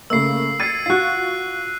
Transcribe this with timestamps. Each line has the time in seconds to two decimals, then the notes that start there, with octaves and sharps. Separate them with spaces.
0.10 C#3 A3 A#3 E6 C7
0.60 G#6 A6 C7 C#7 D#7
0.86 F4 F#4 F#6 C7